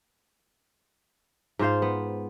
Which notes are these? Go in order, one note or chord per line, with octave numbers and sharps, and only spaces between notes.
G#2 F4 C5 F5
B3